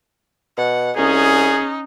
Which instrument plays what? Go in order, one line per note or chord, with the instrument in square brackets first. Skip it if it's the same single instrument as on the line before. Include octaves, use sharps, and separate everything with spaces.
[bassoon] B2 [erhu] F#5
[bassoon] C2 [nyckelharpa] C#4 [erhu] D#4 [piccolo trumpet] G#4